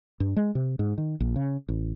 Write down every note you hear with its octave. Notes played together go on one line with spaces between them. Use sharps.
G2
G#3
C3
G#2
D#3
A#1
C#3
A1